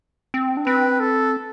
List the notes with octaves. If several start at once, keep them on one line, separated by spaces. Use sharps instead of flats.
C4
D4
C4 B4
A4